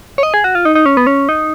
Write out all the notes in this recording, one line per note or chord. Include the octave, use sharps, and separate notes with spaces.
C#5
D#5
G#4
F#4
F4
D#4
D#4
C#4
B3
C#4
D#4